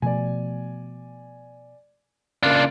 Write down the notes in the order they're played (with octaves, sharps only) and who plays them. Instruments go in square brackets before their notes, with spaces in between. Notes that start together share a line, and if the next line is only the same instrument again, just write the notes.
[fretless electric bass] B2 F3 A3 [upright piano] D5 G#5
[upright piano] C#3 A#3 F5 [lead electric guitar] D4 F4